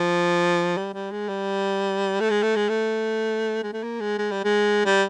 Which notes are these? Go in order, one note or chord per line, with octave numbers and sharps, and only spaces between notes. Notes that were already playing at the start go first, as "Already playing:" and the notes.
Already playing: F3
G3
G3
G#3
G3
A3
G#3
A3
G#3
A3
G#3
A3
A#3
G#3
G#3
G3
G#3
G3